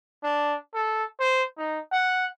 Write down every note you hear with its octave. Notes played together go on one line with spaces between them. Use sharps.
D4
A4
C5
D#4
F#5